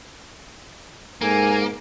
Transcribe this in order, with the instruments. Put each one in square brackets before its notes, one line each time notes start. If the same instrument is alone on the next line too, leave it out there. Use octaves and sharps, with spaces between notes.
[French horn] G#2 [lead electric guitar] A#3 [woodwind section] A4 A#4 G#5